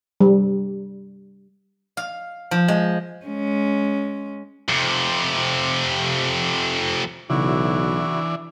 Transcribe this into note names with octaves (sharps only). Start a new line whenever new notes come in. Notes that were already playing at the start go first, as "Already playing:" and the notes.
G3
F5
F3
G#3
G#3 C#4
F2 C3
B1 C#3 E3 D4 E4 F#4